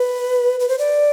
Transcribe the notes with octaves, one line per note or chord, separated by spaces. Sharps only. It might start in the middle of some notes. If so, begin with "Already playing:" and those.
Already playing: B4
B4
C5
D5